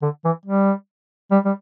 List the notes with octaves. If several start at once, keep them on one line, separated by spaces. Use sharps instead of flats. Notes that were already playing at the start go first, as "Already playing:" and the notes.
D3
E3
G3
G3
G3